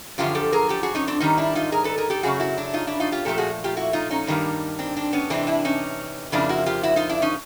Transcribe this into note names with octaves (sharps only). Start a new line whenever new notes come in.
F#2 D3 F3 F4 G4
G4 A4
G#4 A#4
G4 A4
F#4 G#4
C#4 D#4
C4 D4
G#2 D#3 G3 C#4 D#4
D4 E4
D#4 F4
G#4 A#4
A4 B4
G#4 A#4
G4 A4
F#2 C#3 F#3 A3 F#4 G#4
E4 F#4
D4 E4
D#4 F4
D4 E4
D#4 F4
F4 G4
A#2 F3 A3 G4 A4
F#4 G#4
F4 G4
E4 F#4
D#4 F4
C#4 D#4
G2 D#3 G3 A#3
C4 D4
C4 D4
B3 C#4
C3 E3 G#3 C4 D4
D4 E4
C#4 D#4
F2 C#3 F3 A#3 D4 E4
E4 F#4
F4 G4
E4 F#4
D#4 F4
D4 E4
C#4 D#4